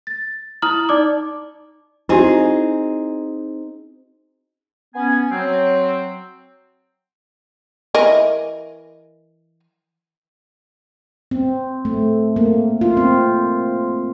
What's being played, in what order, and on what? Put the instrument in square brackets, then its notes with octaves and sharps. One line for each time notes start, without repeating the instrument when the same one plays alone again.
[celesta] A6
E4 A#5 D#6 F6 F#7
D#4 D5 D6
[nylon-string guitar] C4 D#4 G#4 [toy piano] E4 F#4
[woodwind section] B3 C#4 G#5
F#3 C4
[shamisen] E3 A#4 D#5
[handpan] C4
A3
A#3
F4
C4